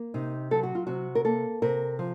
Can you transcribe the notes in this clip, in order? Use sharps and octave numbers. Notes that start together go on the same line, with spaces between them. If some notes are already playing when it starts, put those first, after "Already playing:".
Already playing: A#3
C3 D#4
F#3 A4
F#4
F4
C3 F#4
A#4
A#3 A4
C3 A#4
F3